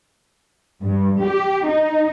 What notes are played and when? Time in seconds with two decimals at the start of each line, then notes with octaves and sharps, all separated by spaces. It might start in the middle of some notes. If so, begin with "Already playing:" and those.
0.83 G2
1.21 G4
1.67 D#4